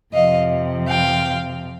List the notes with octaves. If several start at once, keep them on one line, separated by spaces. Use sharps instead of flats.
F2 C3 F3 D#5 F5
F5 G5